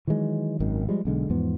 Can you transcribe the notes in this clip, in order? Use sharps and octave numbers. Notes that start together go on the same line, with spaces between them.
D#3 E3 F#3 G#3
G#1 F#2 D#3
F3 G3 G#3
B1 D3 G#3
E2 G#2 F3 B3